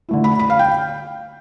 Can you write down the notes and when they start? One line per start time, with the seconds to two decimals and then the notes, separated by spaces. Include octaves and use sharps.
0.09 D3 A3 E4
0.24 B5
0.40 B5
0.50 F5
0.59 G5